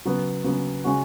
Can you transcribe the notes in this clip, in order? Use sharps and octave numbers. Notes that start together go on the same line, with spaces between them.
C#3 F#3 B3
C#3 F#3 B3
C#3 G#3 C#4 F#4